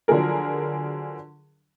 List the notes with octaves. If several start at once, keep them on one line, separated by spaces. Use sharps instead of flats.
D3 F3 F#3 G#4 A#4